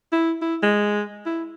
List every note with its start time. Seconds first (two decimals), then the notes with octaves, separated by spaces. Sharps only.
0.13 E4
0.42 E4
0.63 G#3
1.26 E4